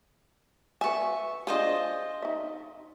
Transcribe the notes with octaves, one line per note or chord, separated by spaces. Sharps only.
B4 E5 G#5 C#6
D4 F4 G#4 C5 D#5
D#4 E5